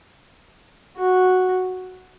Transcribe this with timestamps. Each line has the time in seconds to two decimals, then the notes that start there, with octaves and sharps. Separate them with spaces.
0.97 F#4